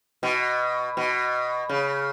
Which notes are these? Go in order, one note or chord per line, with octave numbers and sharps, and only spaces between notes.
B2
B2
C#3